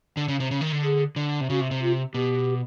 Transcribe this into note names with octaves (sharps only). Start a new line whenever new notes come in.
D3
C#3
C3
C#3
D#3
D3
G#4
D3
C3
C#3 F#4
C3
C3
F4
B2 G4